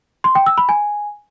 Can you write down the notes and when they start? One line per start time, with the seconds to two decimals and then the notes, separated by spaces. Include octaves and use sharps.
0.24 C6
0.35 G5
0.46 E6
0.58 B5
0.69 G#5